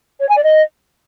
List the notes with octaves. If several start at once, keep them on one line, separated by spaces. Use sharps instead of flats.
C#5
G#5
D5
D#5